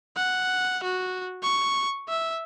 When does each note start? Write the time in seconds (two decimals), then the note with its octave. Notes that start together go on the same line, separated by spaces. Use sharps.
0.17 F#5
0.84 F#4
1.43 C#6
2.09 E5